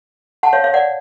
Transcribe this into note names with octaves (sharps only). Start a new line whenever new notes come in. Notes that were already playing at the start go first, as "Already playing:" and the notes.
F#5 A5
C#5 F5
C#5 F5
D5 F#5